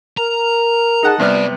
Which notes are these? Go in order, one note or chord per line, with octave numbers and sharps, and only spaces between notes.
A#4 A#5
D#4 G#4 F#5 A5
G2 C3 B3 D5 F6